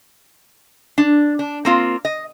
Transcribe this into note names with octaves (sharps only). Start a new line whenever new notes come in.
D4
D4
A#3 C4 F4
D#5